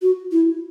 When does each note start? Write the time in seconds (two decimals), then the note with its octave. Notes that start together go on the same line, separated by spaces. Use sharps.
0.01 F#4
0.31 E4